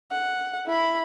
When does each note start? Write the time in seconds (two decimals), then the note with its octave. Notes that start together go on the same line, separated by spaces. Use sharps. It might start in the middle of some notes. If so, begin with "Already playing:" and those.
0.11 F#5
0.67 E4 B5